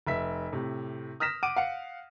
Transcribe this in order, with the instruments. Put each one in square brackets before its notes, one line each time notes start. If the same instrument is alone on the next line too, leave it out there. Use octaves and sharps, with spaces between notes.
[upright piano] F1 E5 B6
A2 C3
D#6 F6 A#6 B6 E7
F#5 D6 D7 D#7
F5 F#5 C#7